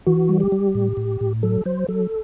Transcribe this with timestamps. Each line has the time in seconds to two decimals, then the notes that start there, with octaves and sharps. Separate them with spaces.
0.06 E3 F#4
0.29 G3
0.40 G4
0.52 G3
0.75 A2
0.97 A2
1.21 A2
1.43 F#3 A4
1.65 F#3 C5
1.88 F#3 A4